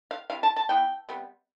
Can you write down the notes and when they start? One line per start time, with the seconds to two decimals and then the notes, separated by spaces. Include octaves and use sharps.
0.11 F5
0.30 C3 E3 F5
0.43 A5
0.56 A5
0.69 E3 B3 G5
1.09 C3 G3 B3